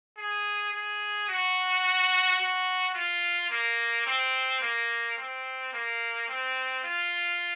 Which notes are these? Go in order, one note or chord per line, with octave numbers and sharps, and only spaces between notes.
G#4
G#4
F#4
F#4
F4
A#3
C4
A#3
C4
A#3
C4
F4